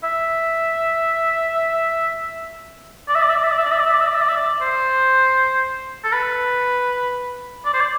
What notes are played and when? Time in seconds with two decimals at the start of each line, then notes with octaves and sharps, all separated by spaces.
0.04 E5
3.08 D5
3.15 E5
3.22 D5
3.29 E5
3.37 D5
3.44 E5
3.51 D5
3.58 E5
3.65 D5
3.72 E5
3.79 D5
3.86 E5
3.94 D5
4.01 E5
4.07 D5
4.15 E5
4.21 D5
4.29 E5
4.36 D5
4.61 C5
6.04 A4
6.13 B4
7.65 D5
7.74 C5
7.81 D5